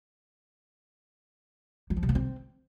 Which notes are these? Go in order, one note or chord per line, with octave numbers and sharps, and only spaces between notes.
F#3
F3
C3
B3
C4